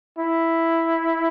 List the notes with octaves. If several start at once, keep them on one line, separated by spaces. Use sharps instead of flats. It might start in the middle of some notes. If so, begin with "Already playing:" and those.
E4